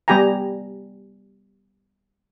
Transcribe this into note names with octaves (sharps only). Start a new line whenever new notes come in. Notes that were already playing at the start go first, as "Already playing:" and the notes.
G3 B3 G4 G5 G#5 A#5